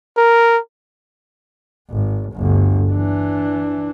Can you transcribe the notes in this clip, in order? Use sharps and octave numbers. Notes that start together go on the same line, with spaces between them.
A#4
G#1
G1 D2
E3 D4